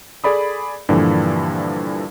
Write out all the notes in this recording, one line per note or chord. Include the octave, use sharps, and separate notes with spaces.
G#4 A4 D5 B5 D#6
G2 A#2 D3 E3 F3